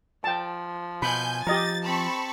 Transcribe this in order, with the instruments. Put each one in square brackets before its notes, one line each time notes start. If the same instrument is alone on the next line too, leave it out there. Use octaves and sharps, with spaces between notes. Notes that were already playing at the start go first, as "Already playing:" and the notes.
[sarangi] F3 [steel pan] G5 A5
[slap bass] B2 [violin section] G#5 G6 [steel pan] B5
[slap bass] F3 [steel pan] G4 D#5 A#5 [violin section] A6
[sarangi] C4 [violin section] A5 B5 C#6